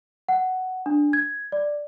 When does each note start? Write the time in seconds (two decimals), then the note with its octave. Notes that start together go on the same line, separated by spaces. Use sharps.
0.29 F#5
0.86 D4
1.13 G#6
1.52 D5